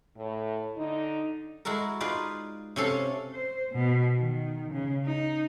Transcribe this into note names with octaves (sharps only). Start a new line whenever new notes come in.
A2
D3 D#4
G#3 E4 F#4 A4 A#4
D#4 F4 G#4 B4 D5
C3 C#4 A4 F5
C5
B2
D#3
C#3
D#4